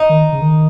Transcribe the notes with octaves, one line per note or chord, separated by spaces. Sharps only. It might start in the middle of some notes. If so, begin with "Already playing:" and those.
Already playing: D#4
D#3
C#3
D#3